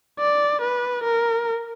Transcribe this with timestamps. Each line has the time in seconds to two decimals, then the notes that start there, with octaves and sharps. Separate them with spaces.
0.19 D5
0.62 B4
1.04 A#4